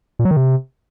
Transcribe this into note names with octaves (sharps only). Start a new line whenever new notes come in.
A#2
F#3
D#3
C3